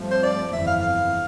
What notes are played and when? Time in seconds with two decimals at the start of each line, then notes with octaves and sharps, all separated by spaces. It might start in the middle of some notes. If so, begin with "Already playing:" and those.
Already playing: G2 F3 A3 C4
0.11 C5
0.23 D5
0.53 G1 F2 E3 E5
0.67 F5
0.81 F5